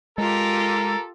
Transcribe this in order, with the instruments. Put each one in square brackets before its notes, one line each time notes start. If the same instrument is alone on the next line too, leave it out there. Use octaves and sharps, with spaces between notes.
[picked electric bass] G#3 [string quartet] F4 G4 [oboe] A4 [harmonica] A#4